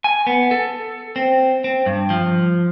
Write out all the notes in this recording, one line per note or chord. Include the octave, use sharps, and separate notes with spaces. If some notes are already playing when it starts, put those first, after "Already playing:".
G#5
B3
A4
C4
C4
G2
F3